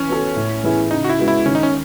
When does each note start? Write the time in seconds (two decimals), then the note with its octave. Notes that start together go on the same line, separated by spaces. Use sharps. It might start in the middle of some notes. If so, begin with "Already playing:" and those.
Already playing: E3 C#4
0.09 B3 F#4 A4
0.36 A2
0.64 E3 B3 E4 G#4
0.91 C#3 D#4
1.04 F#4
1.09 E4
1.19 G#3 B3 F#4
1.28 E4
1.46 D#3 C#4
1.55 D#4
1.63 C#4